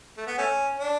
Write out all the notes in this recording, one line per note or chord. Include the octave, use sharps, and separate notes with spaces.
A3
B3
A3 C#4
D4